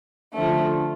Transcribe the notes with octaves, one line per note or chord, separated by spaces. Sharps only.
D3 F3 A3